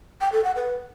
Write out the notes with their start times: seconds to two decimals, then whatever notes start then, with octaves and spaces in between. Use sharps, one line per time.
0.21 G5
0.32 A4
0.44 F#5
0.56 B4